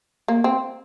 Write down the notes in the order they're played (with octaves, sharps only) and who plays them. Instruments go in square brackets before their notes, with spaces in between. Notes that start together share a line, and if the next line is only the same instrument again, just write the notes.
[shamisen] A#3
C4